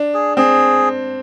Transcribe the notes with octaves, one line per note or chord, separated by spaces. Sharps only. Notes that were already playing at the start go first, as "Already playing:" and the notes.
Already playing: D4
G#4
C4 G#4